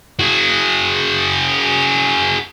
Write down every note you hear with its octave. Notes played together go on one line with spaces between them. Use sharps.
F#4 G#4